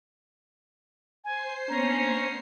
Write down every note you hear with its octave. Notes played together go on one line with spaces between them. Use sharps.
C5 G#5 C7
A#3 B3 C#4 D4 A#5